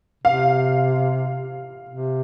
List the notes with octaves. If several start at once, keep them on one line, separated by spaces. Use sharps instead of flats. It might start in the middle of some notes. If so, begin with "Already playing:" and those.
C3 F5
C3